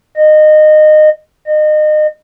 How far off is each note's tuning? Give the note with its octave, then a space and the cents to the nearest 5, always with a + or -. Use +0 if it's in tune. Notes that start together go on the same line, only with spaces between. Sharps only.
D#5 -20
D#5 -30